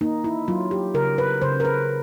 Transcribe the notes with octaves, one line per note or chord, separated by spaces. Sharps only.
A#3 D#4
E4
F#3 F4
G4
C#3 A#4
B4
C#3 C5
A#4
B4